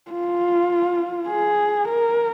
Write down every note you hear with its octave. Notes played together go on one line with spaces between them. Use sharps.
F4
G#4
A#4